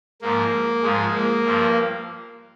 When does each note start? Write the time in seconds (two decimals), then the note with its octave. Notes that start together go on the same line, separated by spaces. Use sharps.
0.22 G#2 F3 A#3
0.83 G#2 F3 G#3
1.14 A#3
1.45 G2 F3